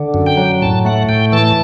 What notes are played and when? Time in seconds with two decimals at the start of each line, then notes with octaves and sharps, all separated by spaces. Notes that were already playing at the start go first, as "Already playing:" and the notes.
Already playing: D3
0.14 F#2
0.26 G5
0.37 F#3
0.62 A2 A5
0.85 A3 F#5
1.09 A2 G5
1.32 E3 A5